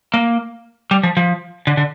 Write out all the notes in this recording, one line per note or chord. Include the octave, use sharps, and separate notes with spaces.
A#3
G3
F3
F3
D3
D3